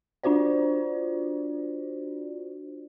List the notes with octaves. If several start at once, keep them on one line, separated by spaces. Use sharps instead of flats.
D4 F4 F#4 C5 D5